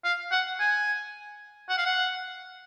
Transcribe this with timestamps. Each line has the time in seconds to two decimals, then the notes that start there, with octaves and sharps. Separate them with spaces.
0.04 F5
0.32 F#5
0.60 G#5
1.69 F#5
1.78 F5
1.86 F#5